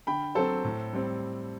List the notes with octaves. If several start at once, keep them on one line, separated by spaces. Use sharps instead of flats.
D3 G5 B5
F#3 C4 A4 C5
A2
G3 C4